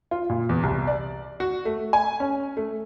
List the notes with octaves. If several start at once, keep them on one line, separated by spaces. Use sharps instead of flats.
F4
A#2
E2
C2
D5
F#4
A3
G#5
C#4
A3